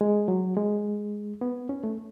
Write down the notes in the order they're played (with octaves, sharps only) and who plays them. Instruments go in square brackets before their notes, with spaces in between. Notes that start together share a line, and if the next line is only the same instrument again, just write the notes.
[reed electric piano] G#3
F#3
G#3
B3
C#4
A3